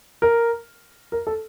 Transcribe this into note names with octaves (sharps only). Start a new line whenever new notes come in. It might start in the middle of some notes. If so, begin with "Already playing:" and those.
A#4
A#4
A4